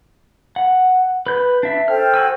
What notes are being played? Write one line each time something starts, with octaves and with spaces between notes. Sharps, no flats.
F#5
B4 G6
D4 E5
A4 C5 G5 F6
F#4 G#5 E6